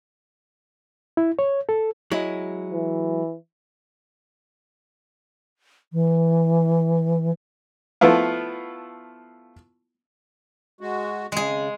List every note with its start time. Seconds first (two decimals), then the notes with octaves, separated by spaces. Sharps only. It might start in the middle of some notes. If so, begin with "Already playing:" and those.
1.17 E4
1.39 C#5
1.69 A4
2.11 F#3 G#3 E4
2.73 E3
5.93 E3
8.01 F3 A3 B3 E4 F4
10.81 G#3 F#4
11.32 C#3 G#3 G#4